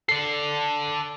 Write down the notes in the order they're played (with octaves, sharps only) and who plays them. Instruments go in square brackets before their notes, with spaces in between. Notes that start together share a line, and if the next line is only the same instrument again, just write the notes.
[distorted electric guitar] A4 D5 [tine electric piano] C7